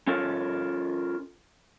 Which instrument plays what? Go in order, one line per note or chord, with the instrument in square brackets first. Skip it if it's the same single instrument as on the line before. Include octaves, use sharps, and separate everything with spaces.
[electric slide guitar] C#4 F4 A4 A#4